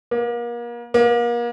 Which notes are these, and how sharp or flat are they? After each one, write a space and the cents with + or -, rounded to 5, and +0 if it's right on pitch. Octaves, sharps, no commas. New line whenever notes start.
A#3 +35
A#3 +35